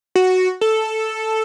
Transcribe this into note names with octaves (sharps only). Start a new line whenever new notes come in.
F#4
A4